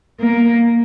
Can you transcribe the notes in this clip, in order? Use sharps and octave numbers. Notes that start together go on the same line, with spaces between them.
A#3